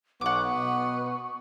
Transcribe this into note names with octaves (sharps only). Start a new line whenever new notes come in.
B1 B3 F#5 C#6 D6
B2